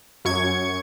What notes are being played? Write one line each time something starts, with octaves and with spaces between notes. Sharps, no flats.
F#2 C#6 G#6